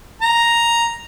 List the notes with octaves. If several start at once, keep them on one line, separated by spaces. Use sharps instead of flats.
A#5